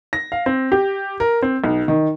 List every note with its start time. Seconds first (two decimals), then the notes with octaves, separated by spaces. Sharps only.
0.13 A#6
0.32 F5
0.46 C4
0.72 G4
1.20 A#4
1.42 C4
1.64 B1
1.88 D#3